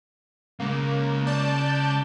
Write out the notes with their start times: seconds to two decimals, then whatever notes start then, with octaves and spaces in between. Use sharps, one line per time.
0.60 C#3 G#3 A#3
1.27 D5 A5 G6